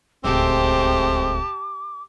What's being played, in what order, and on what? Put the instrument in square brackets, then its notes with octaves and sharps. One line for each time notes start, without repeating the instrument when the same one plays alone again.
[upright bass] D1 C#2 [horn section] G#3 A3 C4 [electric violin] G4 A5 [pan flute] D6